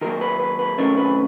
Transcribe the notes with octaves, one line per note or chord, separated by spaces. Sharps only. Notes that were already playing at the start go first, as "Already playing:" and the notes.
D#3 F#3 A#3 A#4
B4
B4
B4
C3 D#3 F#3 A3 C#4 A#4
B4